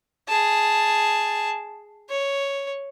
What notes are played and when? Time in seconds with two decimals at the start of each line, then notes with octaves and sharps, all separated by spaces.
0.29 G#4 A5
2.09 C#5